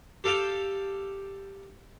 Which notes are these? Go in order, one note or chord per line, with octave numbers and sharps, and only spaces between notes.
G4 A4 F5 G5 A5